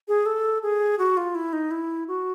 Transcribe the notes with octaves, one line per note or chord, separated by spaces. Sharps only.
G#4
A4
G#4
F#4
F4
E4
D#4
E4
F#4